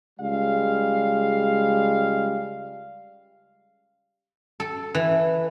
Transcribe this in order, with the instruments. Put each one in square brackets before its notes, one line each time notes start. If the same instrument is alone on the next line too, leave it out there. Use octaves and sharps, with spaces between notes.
[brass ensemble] C#2 G3 G#3 F5
[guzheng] A4
E3